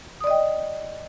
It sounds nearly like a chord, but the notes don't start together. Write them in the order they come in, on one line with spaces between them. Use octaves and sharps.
D#6 D5 D#5 G5